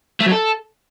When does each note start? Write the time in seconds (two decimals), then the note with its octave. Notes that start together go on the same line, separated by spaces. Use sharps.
0.21 A3
0.26 F#3
0.32 A4